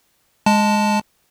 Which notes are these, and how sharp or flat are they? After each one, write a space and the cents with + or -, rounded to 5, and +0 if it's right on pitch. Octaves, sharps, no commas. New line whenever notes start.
G#3 +0 A5 +0